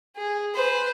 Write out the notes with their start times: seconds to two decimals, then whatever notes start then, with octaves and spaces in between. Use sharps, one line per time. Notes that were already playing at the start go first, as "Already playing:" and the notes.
0.17 G#4
0.54 B4 C5